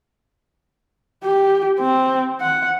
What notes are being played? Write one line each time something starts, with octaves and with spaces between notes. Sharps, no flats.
G4
C4
F#5